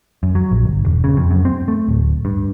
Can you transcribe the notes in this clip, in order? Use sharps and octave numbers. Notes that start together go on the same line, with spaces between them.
F#2
F#3
A#1
G1
E1
C#3
F2
F#2
C4
A3
D1
G2